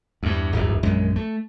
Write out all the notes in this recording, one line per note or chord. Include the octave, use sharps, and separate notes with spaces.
E2 G2
D1 G1 E2
A#1 F#2 G#3
A3